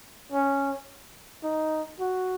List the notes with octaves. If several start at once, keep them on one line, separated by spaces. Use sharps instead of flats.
C#4
D#4
F#4